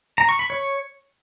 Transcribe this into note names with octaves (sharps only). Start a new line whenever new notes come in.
A#5
C#6
B5
C#5